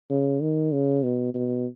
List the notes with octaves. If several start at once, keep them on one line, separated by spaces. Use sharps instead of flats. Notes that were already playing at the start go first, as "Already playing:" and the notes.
C#3
D#3
C#3
B2
B2